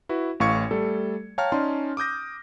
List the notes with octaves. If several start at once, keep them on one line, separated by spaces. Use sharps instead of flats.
E4 F#4 B4
A1 A2 F5 C#6 G#6 C#7
G3 A3 A4
C#5 F5 G5 A5 A#5 F6
C#4 D#4 D5 A5 C6
D6 D#6 G6 A#6